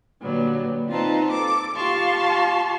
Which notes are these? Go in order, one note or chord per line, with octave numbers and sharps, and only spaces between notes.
A#2 D3 F#3 G3 B3
C4 D#4 F4 B4 A5 A#5
A4 D6
F4 G4 F5 A5 C6 C#6